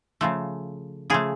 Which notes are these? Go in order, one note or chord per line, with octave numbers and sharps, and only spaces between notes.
C#3 F3 A3
C#3 F3 A3 G#4